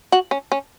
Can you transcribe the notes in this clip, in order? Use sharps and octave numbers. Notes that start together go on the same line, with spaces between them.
F#4
C#4
C#4